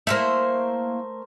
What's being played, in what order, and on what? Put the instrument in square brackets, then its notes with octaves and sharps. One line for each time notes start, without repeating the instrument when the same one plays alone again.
[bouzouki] A3 A#4 C5 [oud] A#3 E4 E5